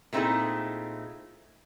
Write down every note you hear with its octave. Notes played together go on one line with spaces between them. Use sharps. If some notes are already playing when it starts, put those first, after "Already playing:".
A#2 A3 C4 D#4 E4 G#4